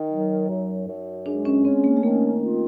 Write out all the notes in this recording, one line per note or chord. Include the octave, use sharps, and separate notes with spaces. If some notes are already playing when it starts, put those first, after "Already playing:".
Already playing: D#3 D#4
F#3
F#2
F#2
G#3 D4
C#4
C4 C#4
A#3
A3
D#3 A#3
F4